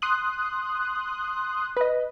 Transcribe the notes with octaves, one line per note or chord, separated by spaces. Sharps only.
C6 D#6 F#6
B4 D#5